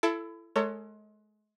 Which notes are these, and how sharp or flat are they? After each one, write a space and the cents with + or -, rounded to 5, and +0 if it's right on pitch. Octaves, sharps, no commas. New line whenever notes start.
E4 +30 A4 +0
G#3 +35 A4 +45 C#5 +10